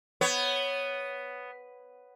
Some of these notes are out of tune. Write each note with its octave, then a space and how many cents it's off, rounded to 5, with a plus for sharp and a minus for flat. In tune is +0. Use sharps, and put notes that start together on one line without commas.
B3 +5 C#5 +0